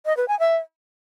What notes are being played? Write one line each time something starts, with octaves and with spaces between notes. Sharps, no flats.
D#5
B4
G#5
E5